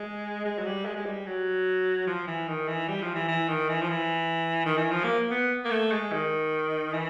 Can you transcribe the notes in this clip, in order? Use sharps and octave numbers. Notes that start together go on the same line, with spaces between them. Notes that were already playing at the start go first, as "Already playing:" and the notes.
Already playing: G#3
G#3
F#3
G3
G#3
G#3
G3
F#3
F3
E3
D#3
E3
G3
F3
E3
E3
D#3
E3
F3
E3
D#3
E3
F3
A#3
B3
A#3
A3
G#3
D#3
E3